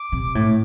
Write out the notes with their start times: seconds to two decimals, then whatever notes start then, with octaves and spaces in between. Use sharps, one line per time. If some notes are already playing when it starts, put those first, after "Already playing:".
Already playing: D6
0.12 C3
0.35 A2